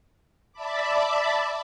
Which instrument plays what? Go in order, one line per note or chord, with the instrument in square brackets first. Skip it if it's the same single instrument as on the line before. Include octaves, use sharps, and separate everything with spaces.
[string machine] D5 E5 A5 B5 D6